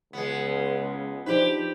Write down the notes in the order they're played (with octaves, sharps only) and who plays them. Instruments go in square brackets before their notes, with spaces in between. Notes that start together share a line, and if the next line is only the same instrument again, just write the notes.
[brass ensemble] C#2 [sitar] G#3 B3
[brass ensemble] F3 D4 [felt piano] D#4 C5 [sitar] G4 B4